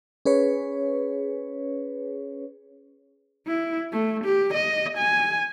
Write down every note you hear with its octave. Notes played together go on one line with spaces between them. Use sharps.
C#4 G#4 B4 C#5
E4
A3
G4
D#5
G#5